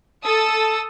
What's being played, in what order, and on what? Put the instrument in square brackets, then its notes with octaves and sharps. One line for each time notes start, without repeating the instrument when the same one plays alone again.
[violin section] A4 A5 D#6 E6